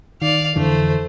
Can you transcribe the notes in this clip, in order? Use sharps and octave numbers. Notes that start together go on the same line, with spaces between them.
D#3 D5 F5
F2 D3 E3 A3 C5